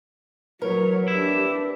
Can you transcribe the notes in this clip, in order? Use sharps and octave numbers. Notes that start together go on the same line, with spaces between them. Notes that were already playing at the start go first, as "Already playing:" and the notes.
F#3 A#4 B4 C#5
D4 E4 G4